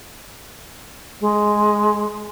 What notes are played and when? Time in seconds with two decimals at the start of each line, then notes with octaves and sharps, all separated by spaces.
1.21 G#3